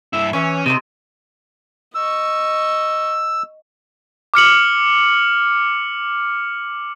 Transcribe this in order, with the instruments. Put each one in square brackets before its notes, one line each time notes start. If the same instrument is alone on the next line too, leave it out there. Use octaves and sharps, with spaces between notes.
[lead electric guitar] G2 E4 [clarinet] E6
[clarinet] E3 [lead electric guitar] C#4 [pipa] C#5 E5
[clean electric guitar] C3 [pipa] G#3 A3 D#4
[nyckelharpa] D#5 C#6 [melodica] E6
[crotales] D6 F6 C#7 F#7